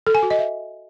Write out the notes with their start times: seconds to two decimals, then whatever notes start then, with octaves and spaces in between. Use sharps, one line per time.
0.07 A4
0.15 G#5
0.23 F#4
0.31 D#5
0.38 E5